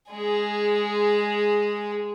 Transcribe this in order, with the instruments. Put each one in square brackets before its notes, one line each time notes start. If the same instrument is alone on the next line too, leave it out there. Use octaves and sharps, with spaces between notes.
[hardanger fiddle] G#3 G#4